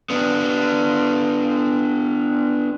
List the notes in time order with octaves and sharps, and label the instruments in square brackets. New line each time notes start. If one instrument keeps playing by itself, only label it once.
[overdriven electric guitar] B3 D4